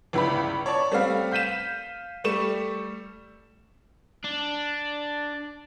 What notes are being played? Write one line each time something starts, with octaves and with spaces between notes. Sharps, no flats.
G1 C#2 E4 B4 D5 B5
C#5 D5 A5 C#6
G3 A3 C4 B4 F5
F5 G6 B6 D#7 E7
G3 A3 C#6 E7
D4